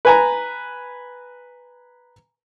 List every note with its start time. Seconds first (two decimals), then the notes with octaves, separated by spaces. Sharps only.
0.05 B4 G#5 A#5